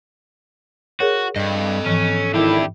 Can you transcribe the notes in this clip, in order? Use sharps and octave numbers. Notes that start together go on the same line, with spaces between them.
F#4 G#4 A#4 C#5
G2 A4 D#5
G#2 E3 F3 C#4
G#1 D4 E4 G4